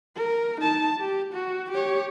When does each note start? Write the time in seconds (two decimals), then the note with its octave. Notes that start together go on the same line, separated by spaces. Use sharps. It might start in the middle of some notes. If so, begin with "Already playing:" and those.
0.16 A#4
0.61 D#4 A5
1.00 G4
1.33 F#4
1.71 G4 C#5